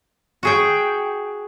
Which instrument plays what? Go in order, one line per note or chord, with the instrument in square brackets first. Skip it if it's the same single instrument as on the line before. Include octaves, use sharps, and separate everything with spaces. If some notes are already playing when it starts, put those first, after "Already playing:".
[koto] F#4 G#4 G5